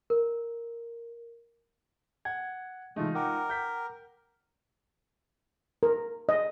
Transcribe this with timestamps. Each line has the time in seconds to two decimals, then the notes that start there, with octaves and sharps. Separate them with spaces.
0.10 A#4
2.25 F#5 G#6
2.96 C3 E3 G#3 A3 D#4 F4
3.15 A#4 F#5 G5 D6
3.50 G6 B6
5.83 A#4
6.29 D#5